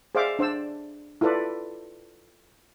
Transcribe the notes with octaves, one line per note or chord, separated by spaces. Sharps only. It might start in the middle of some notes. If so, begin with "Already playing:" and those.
G#4 C5 D5 E5 F5 D6
D4 C5 D5 E6
E4 F4 A4 B4 D5